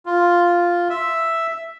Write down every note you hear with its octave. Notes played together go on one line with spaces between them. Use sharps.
F4
E5